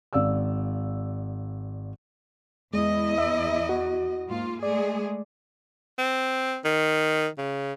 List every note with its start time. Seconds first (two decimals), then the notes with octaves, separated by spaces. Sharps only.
0.13 G#1 D5 F5 E6
2.74 E2 G#3 E4 D#5
3.18 E5
3.69 F#4
4.27 G#2 A#3 F4
4.63 G#3 A3 G#4 D5
5.99 C4
6.65 D#3
7.38 C#3